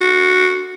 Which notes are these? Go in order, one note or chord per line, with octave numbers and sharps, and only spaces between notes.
F#4